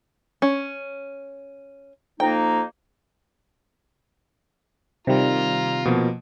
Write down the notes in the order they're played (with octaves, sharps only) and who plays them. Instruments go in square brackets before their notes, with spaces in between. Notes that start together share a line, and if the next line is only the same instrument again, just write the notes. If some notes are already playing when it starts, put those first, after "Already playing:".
[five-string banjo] C#4
[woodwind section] F2 A#3 D#4 [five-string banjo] G5
[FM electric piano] C3 D#3 G3 [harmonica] F4 A#5
[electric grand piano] B2 F3 A#3